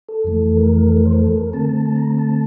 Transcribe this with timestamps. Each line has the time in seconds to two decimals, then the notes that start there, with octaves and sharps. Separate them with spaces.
0.09 A4
0.24 F2 E3 A3
0.57 A#4
0.89 A4
0.97 A#4
1.05 C5
1.13 A#4
1.21 A4
1.37 A#4
1.53 D3 A3 C4 A5
1.69 A5
1.86 A5
1.96 A#5
2.18 A5